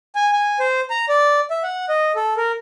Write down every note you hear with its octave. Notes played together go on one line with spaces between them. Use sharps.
G#5
G#5
C5
A#5
D5
E5
F#5
D#5
A4
A#4